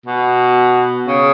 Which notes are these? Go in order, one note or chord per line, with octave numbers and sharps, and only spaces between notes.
B2
C#3